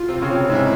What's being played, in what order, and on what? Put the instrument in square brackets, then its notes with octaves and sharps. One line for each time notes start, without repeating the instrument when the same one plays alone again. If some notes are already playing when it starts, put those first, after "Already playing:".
Already playing: [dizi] F4
[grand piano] C3 C4
C#3 C#4
C3 C4
[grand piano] G#2 G#3 [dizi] E4